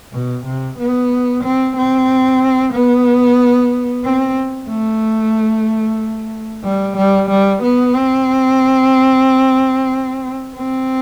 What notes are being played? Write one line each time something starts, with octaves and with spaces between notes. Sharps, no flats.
B2
C3
B3
C4
C4
B3
C4
A3
G3
G3
G3
B3
C4
C4